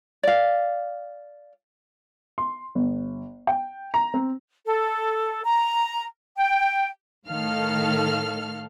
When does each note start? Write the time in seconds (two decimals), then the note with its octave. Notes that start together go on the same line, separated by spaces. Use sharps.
0.23 D5 F5
2.38 C6
2.75 G1
3.47 G5
3.94 A#5
4.14 C4
4.66 A4
5.45 A#5
6.37 G5
7.27 A2 D#3 A4 F5 F6